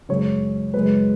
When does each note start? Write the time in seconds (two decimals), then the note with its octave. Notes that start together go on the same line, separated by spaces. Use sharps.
0.09 F#2 C#3 G#3 C#5
0.74 F#2 C#3 G#3 B4